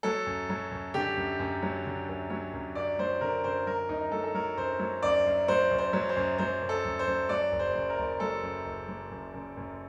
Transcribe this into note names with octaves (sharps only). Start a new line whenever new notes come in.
F#3 A4
F#2
F#3
F#2
D3 G4
F#2
F#2
F#3
D3
F#2
F#3
F#2
F#2 D5
F#3 C5
D3 A#4
F#2 C5
F#3 A#4
F#2 D#4
F#3 A4
A4
F#3 A#4
F#2 C5
F#3
F#2 D5
F#2
F#3 C5
F#2
C5
F#3
C5
F#2
F#3 C5
F#2
A4
F#2
C5
F#2
F#3 D5
F#1
C5
F#2
A#4
F#1
F#3 A4
F#2
F#1
F#3
F#2
F#2
F#2